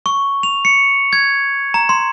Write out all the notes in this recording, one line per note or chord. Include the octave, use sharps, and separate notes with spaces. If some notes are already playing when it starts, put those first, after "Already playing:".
C#6
F7
C#7
G#6
A#5
C6